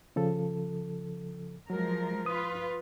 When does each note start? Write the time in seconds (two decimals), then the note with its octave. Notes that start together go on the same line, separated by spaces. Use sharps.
0.16 C#3 F3 A4
1.70 F3 F#3 G#3 A#4
2.26 F4 B4 D#6